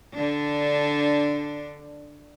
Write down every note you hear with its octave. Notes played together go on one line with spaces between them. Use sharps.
D3 D4